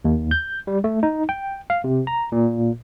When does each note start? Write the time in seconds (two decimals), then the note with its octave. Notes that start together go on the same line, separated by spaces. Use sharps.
0.05 D#2
0.31 G6
0.67 G3
0.84 A3
1.03 D#4
1.29 G5
1.70 F5
1.84 C3
2.07 A#5
2.32 A#2